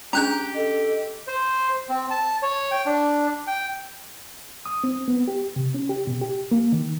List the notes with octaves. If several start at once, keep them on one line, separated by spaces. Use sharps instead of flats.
C#4 D4 G4 G#4 A#5 F#6 G6
A4 D#5
C5
C4
A5
C#5
G5
D4
G5
D#6
C4
B3
G4
C3
C#4
G4
B2
G4
A#3
D#3